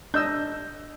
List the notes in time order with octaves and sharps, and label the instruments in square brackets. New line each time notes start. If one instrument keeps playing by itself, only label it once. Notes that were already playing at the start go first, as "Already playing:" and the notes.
[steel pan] D4 D#5 E6 [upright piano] G6